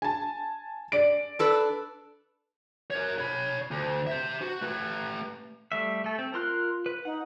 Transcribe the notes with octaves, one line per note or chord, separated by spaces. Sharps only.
G#5 A5
D5 D7
D4 A4 B4
A#4 C#5
C#5 B5
D2
C5 E5
F#4
A3 B4
G3 A3 E5
A3 A4
C4
F4 A#4 C6 F#6
B4
D#4 F#5